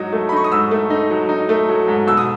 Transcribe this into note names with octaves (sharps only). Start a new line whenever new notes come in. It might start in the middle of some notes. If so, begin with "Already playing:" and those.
Already playing: G#2 F#3 D#4
A3
B5
D#4 C#6
D#6
G#2 E6
A3
D#4
F#3
D#4
A3
F#3
G#2
B2 E6
D#6